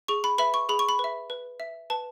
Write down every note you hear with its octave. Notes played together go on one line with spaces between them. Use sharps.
G#4 C#6
B5
B4 E5 B5
C#6
G#4 B5
C#6
B5
B4
E5
B4
E5
B4 A5